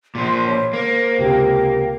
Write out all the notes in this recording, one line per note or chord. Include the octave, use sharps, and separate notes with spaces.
A#2 F3 C6
C#5 C6
A#3 C5
C#2 C3 G5